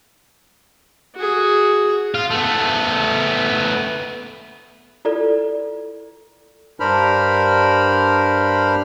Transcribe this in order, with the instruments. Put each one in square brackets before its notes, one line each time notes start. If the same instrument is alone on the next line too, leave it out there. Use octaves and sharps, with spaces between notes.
[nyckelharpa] F#4 G#4
[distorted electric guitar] F4
A3 B3
[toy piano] E4 F4 A4 B4 D5
[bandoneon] G2 D4 A#4 C5 B5 F6